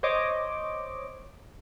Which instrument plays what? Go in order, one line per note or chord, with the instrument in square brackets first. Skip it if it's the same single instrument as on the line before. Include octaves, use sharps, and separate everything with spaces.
[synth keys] C5 C#5 D#5 D6